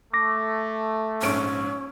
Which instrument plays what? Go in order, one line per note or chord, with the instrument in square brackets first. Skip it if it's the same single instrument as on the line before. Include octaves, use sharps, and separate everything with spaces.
[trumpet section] A3 [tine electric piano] D6 A#6
[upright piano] A#1 G#2 D7 [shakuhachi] C#4